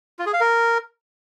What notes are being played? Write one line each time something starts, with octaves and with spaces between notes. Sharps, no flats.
F4
G#4
F5
A#4